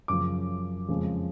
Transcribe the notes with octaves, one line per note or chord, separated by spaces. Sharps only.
F#2 C#3 F3 D6
F2 C#3 F3 G#3